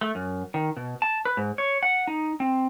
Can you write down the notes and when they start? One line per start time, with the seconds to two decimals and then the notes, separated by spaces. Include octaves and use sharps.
0.01 A3
0.15 F#2
0.54 D#3
0.77 B2
1.02 A5
1.25 B4
1.37 G#2
1.58 C#5
1.83 F#5
2.07 D#4
2.40 C4